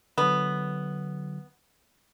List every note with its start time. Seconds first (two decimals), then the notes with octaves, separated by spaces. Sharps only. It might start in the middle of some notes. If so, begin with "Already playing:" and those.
0.18 D3 F#3 B3